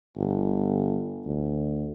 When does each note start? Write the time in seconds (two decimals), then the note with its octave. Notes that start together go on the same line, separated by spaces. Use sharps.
0.17 G1
1.26 D2